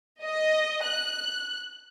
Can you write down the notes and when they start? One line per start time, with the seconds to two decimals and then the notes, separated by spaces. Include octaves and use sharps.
0.22 D#5
0.84 F#6